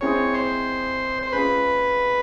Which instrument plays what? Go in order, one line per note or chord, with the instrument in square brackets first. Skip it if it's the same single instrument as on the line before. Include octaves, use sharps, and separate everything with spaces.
[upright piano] G#3 C4 E4 G#4 [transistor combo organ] C#5
[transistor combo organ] C5
C5
[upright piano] G#3 C#4 F4 G#4 [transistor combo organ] B4